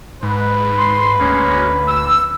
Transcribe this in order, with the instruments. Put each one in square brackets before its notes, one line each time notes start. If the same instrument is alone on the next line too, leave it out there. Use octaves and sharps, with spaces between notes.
[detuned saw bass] G#2 [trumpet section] B4
[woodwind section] C6
[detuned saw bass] D2 [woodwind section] G#3 A#3 C#4
[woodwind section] E6